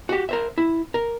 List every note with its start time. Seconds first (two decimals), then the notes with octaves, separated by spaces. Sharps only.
0.09 F#4 G4
0.29 A#4 C5 E5
0.58 E4
0.94 A#4